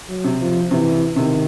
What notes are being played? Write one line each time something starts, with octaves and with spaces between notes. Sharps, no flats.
F#3
C3
F3
C3 E3
C3 D#3